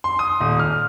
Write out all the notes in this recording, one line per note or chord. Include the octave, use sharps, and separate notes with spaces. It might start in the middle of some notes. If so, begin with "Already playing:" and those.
C6
D#6
D#1
F6